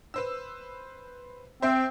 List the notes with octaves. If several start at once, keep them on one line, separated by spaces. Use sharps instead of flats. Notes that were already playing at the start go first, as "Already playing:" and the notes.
B4 C5 E6
C4 C5 E5 G5